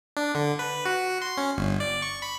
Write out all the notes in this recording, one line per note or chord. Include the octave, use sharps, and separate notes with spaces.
D4
D3
B4
F#4
C6
C#4
G1
D5
C#6
B5